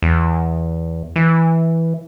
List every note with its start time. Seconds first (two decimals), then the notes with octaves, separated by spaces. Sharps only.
0.02 E2
1.16 E3